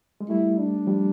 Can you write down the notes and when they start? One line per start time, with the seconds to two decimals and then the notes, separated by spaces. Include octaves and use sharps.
0.21 G#3
0.29 G3 A3 E4
0.58 D4
0.87 F3 G3